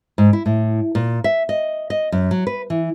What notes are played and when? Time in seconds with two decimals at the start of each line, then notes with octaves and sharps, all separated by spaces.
0.18 G#2
0.33 E4
0.46 A2
0.95 A#2
1.24 E5
1.49 D#5
1.90 D#5
2.12 F#2
2.31 F#3
2.47 B4
2.70 E3